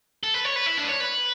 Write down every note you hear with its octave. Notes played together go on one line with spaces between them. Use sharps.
A4
B4
C#5
B4
E4
D4
B4
C#5
B4